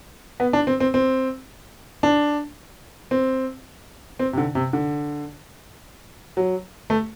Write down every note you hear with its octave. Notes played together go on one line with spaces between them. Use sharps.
B3
D4
C4
C4
C4
D4
C4
C4
C3
D3
C3
D3
F#3
A3